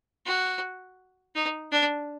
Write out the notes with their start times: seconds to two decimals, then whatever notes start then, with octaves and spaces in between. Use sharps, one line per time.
0.26 F#4
1.35 D#4
1.72 D4